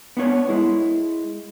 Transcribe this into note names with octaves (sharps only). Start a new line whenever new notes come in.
B3 D4 C#5
G#3 E4